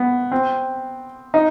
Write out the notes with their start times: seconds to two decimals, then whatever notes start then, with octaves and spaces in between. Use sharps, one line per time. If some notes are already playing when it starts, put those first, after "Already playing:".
Already playing: B3
0.32 C4
1.34 D#4